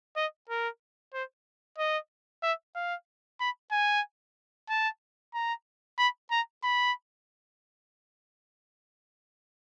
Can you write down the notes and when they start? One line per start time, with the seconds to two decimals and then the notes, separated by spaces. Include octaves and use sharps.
0.16 D#5
0.49 A#4
1.14 C5
1.78 D#5
2.43 E5
2.75 F5
3.40 B5
3.72 G#5
4.69 A5
5.34 A#5
5.98 B5
6.31 A#5
6.63 B5